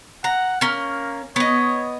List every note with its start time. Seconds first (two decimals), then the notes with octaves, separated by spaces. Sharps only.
0.24 F#5 A#5
0.61 A#3 C#4 A#4
1.36 B3 C#5 D#5